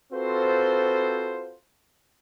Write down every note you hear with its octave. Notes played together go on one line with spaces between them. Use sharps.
C4 F4 F#4 A4 B4 C5